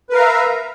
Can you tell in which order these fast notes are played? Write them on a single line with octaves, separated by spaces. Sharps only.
B4 A#4 F5 A#5 E5